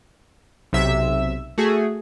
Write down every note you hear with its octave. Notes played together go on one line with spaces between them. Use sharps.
B1 C3 E5 E6
A3 F#4 G#4